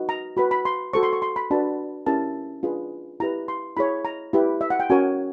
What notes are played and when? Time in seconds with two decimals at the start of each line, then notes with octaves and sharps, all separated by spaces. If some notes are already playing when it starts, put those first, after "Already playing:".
Already playing: D#4 F#4 B4
0.09 A#5
0.37 F#4 B4 B5
0.51 B5
0.65 C6
0.93 F#4 A4 C5 C#6
1.03 C6
1.13 C#6
1.22 C6
1.36 B5
1.51 D4 F#4 B4 A5
2.07 C#4 E4 G4 A#4 A5
2.63 D4 F4 G#4 B4
3.20 E4 G4 B4 A#5
3.48 C6
3.77 E4 G#4 C#5 B5
4.05 A#5
4.33 E4 G4 B4
4.61 E5
4.70 F#5
4.80 G5
4.90 C#4 F#4 A#4 C#5 G#5